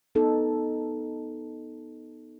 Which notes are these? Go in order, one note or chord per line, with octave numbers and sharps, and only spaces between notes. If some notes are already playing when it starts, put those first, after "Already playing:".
B3 D#4 A4